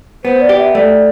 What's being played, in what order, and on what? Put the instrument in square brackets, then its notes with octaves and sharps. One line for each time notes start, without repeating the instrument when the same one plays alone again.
[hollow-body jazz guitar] B3 [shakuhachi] C5
[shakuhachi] D5
[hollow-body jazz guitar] G4
[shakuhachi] E5
[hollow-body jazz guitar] A3 [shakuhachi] D5